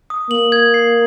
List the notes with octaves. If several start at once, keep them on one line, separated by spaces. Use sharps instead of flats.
D#6
A#3 F#7
G#6
C7